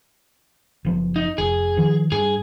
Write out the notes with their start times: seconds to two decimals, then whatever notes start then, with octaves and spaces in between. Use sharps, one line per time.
0.85 F#1 F3 B3
1.16 D#4
1.38 F1 G#4
1.77 D#3 F3
2.12 G2 G#4